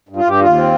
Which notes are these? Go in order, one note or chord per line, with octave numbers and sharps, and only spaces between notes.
G2
F4
G2 G4
D#2 F4
C4